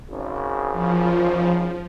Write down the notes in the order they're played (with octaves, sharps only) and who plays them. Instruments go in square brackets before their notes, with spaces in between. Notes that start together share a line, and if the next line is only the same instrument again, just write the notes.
[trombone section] G#1 C#3
[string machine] F3